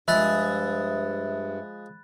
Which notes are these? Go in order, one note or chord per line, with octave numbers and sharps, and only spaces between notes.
G2 F3 G#3 G#4 E5 B5 F#6 A6